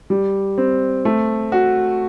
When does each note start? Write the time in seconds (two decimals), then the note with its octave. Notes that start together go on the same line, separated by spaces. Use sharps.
0.10 G3
0.58 C4
1.05 A3
1.52 F#4